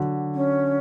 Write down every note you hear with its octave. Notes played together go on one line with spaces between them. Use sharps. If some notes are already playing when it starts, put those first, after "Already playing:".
Already playing: D3 F#3
C#4